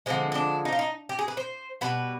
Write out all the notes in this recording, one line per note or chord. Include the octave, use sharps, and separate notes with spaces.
D3 F3 G#3 C4
C4
D4
D#4
F4
D#4
G4
G#4
B4
C5
B2 G3 B4